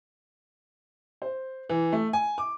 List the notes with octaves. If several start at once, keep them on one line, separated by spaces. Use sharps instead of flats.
C5
E3
A3
G#5
D6